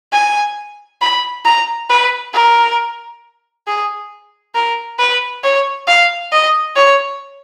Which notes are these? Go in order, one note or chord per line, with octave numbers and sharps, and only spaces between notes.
G#5
B5
A#5
B4
A#4
G#4
A#4
B4
C#5
F5
D#5
C#5